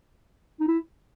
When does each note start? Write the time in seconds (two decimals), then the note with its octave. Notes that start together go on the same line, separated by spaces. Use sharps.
0.60 D#4
0.68 E4